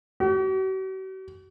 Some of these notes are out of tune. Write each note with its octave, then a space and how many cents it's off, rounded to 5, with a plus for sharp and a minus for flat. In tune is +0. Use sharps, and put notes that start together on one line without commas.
F#4 +45